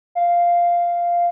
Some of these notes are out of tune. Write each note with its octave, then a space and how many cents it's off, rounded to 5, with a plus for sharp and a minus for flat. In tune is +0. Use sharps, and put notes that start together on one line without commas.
F5 -5